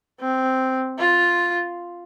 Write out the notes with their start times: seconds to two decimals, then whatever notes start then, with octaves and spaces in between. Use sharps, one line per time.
0.20 C4
0.99 F4